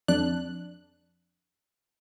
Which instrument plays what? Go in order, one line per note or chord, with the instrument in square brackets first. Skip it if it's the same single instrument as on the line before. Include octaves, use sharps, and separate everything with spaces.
[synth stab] F2 D4 F#6